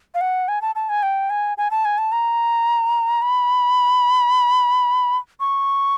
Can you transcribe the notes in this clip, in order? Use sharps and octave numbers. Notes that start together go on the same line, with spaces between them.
F5
F#5
G#5
A5
A5
G#5
G5
G#5
G#5
A5
G#5
A5
A#5
B5
C#6